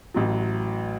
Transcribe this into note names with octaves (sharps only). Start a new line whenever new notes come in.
A1 A2 F#3